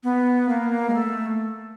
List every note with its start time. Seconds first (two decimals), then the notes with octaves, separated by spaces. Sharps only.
0.04 B3
0.49 A#3
0.90 G#3
0.94 A3